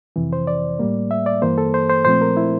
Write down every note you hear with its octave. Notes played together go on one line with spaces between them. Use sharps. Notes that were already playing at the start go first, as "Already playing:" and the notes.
F2 C3 E3
C5
D5
A2 G3 A#3
E5
D5
G2 E3 A#3 C5
A4
C5
C5
A#2 F3 A3 C4 C5
A#4
E4